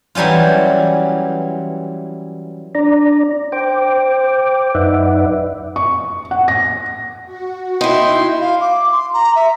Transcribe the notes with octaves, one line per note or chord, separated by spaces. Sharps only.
E3 F#3 G3 C#4 F4
D4 D5 A#5
C5 G5 D6
F#2 D#4 B4 D5 E5 F#5
C#6
F#5
A#6
F#4
D#4 E4 G5 C6
F5
D6
C6
A#5
E5